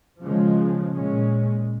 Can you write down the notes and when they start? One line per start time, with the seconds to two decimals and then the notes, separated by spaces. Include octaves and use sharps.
0.21 C#3 F3 G#3
0.90 A#2 G#3 C#4